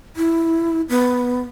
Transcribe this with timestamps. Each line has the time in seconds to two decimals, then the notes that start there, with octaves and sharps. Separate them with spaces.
0.16 E4
0.89 B3